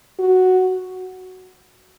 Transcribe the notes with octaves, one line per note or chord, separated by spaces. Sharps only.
F#4